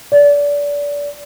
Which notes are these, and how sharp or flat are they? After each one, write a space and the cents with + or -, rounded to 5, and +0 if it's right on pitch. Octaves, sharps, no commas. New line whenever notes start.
D5 -25